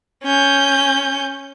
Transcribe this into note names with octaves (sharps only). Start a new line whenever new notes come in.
C#4 G6